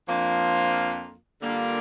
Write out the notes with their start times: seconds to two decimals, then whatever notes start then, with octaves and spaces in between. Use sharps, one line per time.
0.07 F2 F3 A#3 D4 F4
1.42 D3 G3 A#3 D4 F4